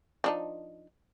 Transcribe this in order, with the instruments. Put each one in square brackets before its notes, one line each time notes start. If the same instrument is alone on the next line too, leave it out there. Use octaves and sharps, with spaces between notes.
[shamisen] F3 D4 D#4